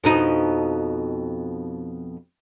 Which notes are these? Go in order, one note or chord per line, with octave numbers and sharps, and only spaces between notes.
F2 B2 D#4